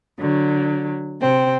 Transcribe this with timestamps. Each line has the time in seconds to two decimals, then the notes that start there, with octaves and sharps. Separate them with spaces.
0.18 D3 F#3
1.20 C3 C4